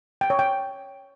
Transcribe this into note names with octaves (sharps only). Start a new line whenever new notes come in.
G5
C#5
G5